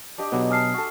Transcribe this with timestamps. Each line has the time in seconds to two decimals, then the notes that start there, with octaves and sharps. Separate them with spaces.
0.18 D4 G4 D#5 D6
0.32 B2 F#3 B3
0.50 G#5 A5 D#6 F6 C7
0.74 F#4 A4